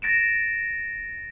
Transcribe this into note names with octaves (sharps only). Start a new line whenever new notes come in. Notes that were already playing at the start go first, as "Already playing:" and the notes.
A6 A#6 D7 E7